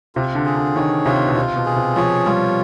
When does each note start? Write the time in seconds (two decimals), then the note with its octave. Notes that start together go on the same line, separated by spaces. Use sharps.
0.15 C3 F4
0.35 D3
0.46 G#4
0.56 D3
0.76 D#3 C#5
1.06 C3 F4
1.28 B2
1.35 C3 F4
1.56 B2
1.65 G#4
1.76 C3
1.96 F3 C#5
2.26 G3 F4